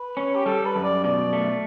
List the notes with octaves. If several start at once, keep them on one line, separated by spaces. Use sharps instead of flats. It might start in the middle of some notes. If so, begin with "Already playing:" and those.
Already playing: B4
C#4
G4
G3 A4
B4
F#2
D5
B2 D5
A3